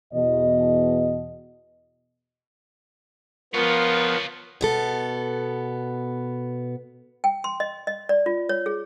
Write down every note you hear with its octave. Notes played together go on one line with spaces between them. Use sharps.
E2 B2 D#5
F3 B3 F4 A#4 C#5
B2 B3 A4
G5
C6
D#5
D#5
D5
F4
C#5
G#4